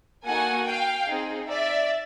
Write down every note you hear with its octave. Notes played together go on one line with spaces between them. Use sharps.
A#3 D#4 F#4 A4 F#5 G#5
F5 G5
C4 D#4 G#4
D5 E5